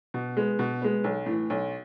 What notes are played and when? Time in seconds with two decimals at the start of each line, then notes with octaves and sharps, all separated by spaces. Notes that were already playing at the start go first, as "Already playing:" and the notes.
0.14 B2
0.37 G#3 B3
0.59 B2
0.82 G#3 B3
1.04 B1
1.26 A2 E3
1.50 B1